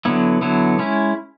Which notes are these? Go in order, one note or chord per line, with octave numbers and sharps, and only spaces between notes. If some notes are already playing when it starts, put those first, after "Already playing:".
D3 F#3 B3 E4
D3 F#3 B3 E4
G#3 C#4 E4